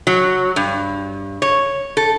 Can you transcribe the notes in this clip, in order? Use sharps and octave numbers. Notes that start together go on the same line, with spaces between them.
F#3
G2
C#5
A4